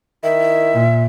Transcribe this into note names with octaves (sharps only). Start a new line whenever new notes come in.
D#3 E4 E5
A#2